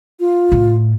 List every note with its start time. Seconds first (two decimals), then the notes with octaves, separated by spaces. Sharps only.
0.20 F4
0.52 A2